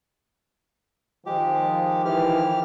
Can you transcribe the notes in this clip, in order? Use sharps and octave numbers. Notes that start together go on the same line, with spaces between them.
D#3 F3 G#3 G4
E3 G4 F6